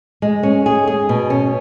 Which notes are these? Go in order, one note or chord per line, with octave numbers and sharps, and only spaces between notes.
G#3
C#4
G#4
G#4
B2
C#4